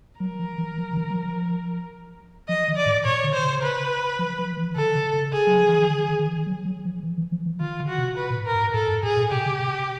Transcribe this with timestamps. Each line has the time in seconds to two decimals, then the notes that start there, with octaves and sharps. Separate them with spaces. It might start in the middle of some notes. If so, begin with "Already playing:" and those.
0.20 F#3 A#4
0.39 F3
0.58 E3
0.78 F3
0.93 D#3
0.97 E3
1.10 F#3
1.16 F3
2.48 F3 D#5
2.68 D#3
2.76 D5
2.86 A2
3.05 A#2 C#5
3.24 D3
3.34 C5
3.43 C#3
3.62 B4
4.19 F3
4.39 F3
4.57 E3
4.76 D3 A4
4.95 C#3
5.13 C#3
5.32 G#4
5.47 F#3
5.58 F3
5.69 E3
5.79 D#3
5.90 D3
6.08 D#3
6.19 D#3
6.27 E3
6.46 F#3
6.65 F#3
6.85 F3
7.03 E3
7.18 E3
7.32 F3
7.46 E3
7.60 D#3 F4
7.80 D3
7.89 F#4
7.98 C3
8.18 B4
8.30 A#2
8.36 A2
8.46 A#4
8.55 G#2
8.74 A2 A4
8.88 G2
9.03 A2 G#4
9.17 A#2
9.31 C3 G4
9.46 C#3
9.60 C3